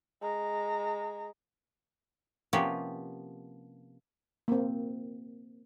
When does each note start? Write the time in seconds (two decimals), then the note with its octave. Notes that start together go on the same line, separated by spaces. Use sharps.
0.22 G#3 A#5
2.53 C3 F3 A#3 B3 C#4 G4
4.48 A#3 C4